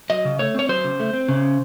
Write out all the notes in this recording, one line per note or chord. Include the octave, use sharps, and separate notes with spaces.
F#3 D#5
C#3
A3 C#5
C4 C#5
F#3 C5
C#3
A3
C4
C#3